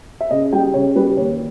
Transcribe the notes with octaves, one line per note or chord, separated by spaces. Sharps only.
E5
C#3 D#5
G3 G5
C#3 C#5
G3 B4
D#2 C#5